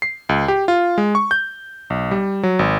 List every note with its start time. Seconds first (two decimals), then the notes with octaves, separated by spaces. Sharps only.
0.02 C7
0.29 C#2
0.48 G4
0.68 F4
0.98 G#3
1.15 C#6
1.31 G6
1.90 B1
2.11 G3
2.43 F#3
2.59 G#1